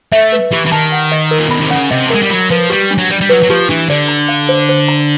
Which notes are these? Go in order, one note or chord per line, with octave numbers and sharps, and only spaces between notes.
A3 E5
B4
E3 G4
E3
D#3 A5
F#5
D#5
A#4
A#2
B2 B5
C3
C#3 F#5
C3 D#5
A3
G#3 A#4
G3
F#3 B5
F3 B4
G3 G4
D4
F#3
G3 D5
G3
F#3 B4
F#3
F3 G4
E3 D4
D3 D5
A#5
F5
C5
C5
A#5